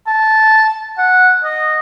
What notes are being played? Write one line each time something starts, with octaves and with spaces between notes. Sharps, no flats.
A5
F#5
D#5